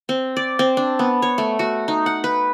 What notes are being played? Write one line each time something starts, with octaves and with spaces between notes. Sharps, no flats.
C4
D5
C4
D4
B3
C#5
A3
F#4
D#4
F#5
B4